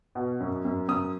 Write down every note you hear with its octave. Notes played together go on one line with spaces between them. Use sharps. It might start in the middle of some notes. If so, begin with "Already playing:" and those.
B2
F#2
F#2
F#2 D#6